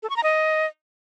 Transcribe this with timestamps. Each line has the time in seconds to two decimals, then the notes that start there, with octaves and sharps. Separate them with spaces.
0.03 A4
0.10 C#6
0.16 A#5
0.23 D#5